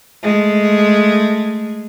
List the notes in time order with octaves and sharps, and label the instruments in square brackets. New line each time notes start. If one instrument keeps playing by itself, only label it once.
[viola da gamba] G#3 A3